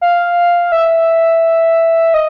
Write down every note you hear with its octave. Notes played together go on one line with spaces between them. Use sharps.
F5
E5
D#5